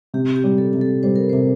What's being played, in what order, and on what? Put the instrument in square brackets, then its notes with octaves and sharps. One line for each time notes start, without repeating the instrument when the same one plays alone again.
[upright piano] C3 [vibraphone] G4
[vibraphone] G4
[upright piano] G3
[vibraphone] A4
[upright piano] C3
[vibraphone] A4
[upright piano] G3 [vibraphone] C5
[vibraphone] A#4
C5
[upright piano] C3